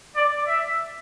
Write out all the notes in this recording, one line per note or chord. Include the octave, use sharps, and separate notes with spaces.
D5
E5